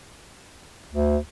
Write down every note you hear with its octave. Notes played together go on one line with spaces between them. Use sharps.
D2